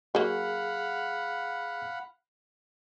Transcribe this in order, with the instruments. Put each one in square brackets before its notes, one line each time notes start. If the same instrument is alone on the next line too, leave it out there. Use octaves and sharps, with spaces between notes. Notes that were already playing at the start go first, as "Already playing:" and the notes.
[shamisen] F#3 A#3 [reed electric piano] G#4 [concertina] F5 F#5 B5